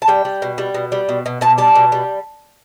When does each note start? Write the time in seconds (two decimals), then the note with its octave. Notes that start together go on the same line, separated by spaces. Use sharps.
0.02 A5
0.08 G3 G5
0.25 G3
0.42 B2
0.58 G3
0.74 B2
0.92 G3
1.09 B2
1.26 B2
1.41 B2 A5
1.58 G3 A5
1.75 B2
1.92 G3